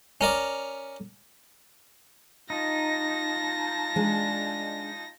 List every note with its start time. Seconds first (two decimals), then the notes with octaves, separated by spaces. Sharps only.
0.21 C#4 A#4 D5
2.50 D#4 F4 A5 A#6
3.96 G#3 D4